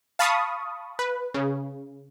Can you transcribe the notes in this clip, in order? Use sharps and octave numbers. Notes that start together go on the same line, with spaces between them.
F5 A5 B5 C#6 D#6
B4
C#3